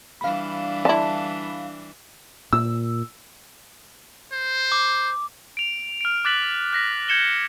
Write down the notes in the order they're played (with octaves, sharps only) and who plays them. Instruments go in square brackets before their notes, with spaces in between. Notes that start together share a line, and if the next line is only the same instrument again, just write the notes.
[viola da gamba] E3 G3 D4 [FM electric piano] F5 B5
[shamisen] D3 E4 [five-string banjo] A5
[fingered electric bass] A#2 [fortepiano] E6
[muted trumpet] C5
[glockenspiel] D6
[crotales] D7 F7
F6 D7
D6 F#6 A6 B6 F#7
F#6 A#6 B6
G6 G#6 C#7 E7 G7